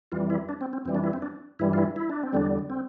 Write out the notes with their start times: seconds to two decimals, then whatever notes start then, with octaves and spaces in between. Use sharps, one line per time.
0.12 F2 E3 G3 F4
0.30 E4
0.49 D4
0.61 C4
0.73 C4
0.85 F2 E3 G3 C4
0.95 D4
1.04 E4
1.13 C4
1.22 D4
1.59 G2 E3 G3 E4
1.73 F4
1.78 E4
1.96 E4
2.09 D4
2.23 C4
2.33 E2 D3 G3 D4
2.70 C4